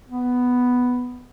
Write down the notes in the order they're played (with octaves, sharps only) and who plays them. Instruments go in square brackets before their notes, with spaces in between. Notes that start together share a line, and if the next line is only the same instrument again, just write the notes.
[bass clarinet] B3